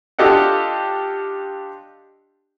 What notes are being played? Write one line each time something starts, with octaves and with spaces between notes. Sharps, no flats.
D4 F4 G4 A4 D#5 F#5